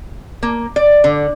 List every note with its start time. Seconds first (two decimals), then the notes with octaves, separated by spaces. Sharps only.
0.43 A#3
0.76 D5
1.04 D3